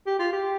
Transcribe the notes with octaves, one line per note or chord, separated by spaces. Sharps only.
G4
F4
G4